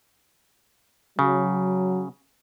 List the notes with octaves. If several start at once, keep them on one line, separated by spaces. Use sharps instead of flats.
C#3 F#3